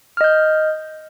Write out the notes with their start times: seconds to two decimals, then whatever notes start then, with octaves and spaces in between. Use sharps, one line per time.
0.17 F6
0.21 D#5
0.24 G6